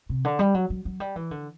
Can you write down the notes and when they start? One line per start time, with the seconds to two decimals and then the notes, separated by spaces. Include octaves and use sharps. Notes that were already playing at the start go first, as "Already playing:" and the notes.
0.09 C3
0.25 D3
0.39 G3
0.54 F#3
0.70 F#3
0.85 F#3
1.00 G3
1.16 E3
1.31 D3